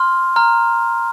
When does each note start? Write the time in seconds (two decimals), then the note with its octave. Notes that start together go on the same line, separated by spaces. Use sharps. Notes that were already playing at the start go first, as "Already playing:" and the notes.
Already playing: C6 F6
0.36 A#5 F6